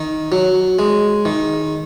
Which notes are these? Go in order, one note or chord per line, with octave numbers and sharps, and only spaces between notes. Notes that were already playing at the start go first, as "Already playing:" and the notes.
Already playing: D#3
F#3
G#3
D#3